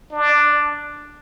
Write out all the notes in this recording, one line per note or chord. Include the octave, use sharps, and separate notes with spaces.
D4